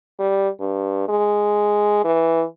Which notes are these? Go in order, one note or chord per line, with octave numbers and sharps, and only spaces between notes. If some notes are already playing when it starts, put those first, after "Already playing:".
G3
G2
G#3
E3